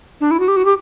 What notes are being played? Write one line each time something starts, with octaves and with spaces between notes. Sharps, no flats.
D4
E4
F#4
G4
F#4
G4